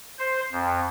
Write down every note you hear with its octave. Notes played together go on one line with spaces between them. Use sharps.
C5
F2